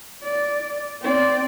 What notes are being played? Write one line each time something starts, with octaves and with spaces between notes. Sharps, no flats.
D5
C4 D5